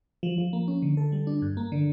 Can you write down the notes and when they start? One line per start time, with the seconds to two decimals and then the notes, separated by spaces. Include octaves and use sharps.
0.23 F3
0.38 F3
0.53 A#3
0.68 C#4
0.82 D3
0.97 A4
1.12 G3
1.27 D4
1.42 G2
1.57 A#3
1.72 D3